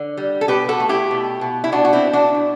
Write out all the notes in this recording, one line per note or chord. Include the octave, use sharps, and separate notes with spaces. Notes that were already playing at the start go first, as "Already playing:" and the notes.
Already playing: D3
G3
A4
B2 G4 B4
F#4 A4
A3
E4 G4
B2
B2
E4
B2 D4 F#4
F#4
C4 E4
B2
D4 F#4
B2